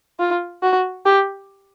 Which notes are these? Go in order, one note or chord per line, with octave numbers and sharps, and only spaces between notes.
F4
F#4
G4